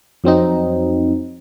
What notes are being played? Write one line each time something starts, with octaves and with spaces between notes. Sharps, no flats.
F2 F#3 C4 D#4